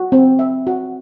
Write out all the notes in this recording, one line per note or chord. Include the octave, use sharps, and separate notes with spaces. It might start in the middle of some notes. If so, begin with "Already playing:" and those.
Already playing: F#4
C4
E5
F#4